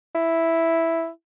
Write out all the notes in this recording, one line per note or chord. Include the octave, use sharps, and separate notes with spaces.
E4